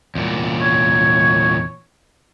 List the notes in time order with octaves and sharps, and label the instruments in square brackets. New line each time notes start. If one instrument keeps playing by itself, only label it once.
[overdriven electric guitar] E2 A#2
[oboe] C#5